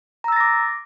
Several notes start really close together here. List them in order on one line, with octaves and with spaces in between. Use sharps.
A#5 E6 A6 A#6 D6